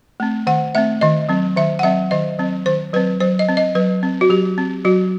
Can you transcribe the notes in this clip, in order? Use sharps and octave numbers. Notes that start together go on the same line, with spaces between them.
A3 C4
D#3 F#5
A3 C4 E5
D#3 D#5
F#3 C4
D#3 E5
F#5
F#3 C4 E5
D#3 D#5
F#3 C4
D#3 C5
F#3 C4 B4
F#3 C5
D#5
C4
D#5
F#3 B4
C4
F#4
F#3 G4
C4
F#3 F#4